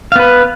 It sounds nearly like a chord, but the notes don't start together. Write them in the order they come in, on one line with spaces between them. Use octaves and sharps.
F5 B3 B4